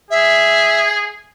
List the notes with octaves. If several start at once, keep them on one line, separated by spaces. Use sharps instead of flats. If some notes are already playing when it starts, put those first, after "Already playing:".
G#4 E5